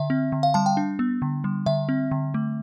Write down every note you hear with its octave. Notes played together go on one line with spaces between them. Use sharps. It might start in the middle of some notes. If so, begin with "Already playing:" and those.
Already playing: D3 E5
C4
D3
F5
G3 A5
G5
D4
B3
D3
G3
D3 E5
C4
D3
A3